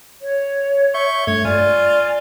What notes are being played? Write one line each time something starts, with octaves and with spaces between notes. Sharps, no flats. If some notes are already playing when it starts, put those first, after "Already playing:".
C#5
E5 C#6 G6
G2 A3 C#5 G#6
F4 D5 G#5